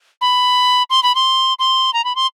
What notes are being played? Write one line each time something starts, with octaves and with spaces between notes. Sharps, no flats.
B5
C6
B5
C6
C6
A#5
B5
C6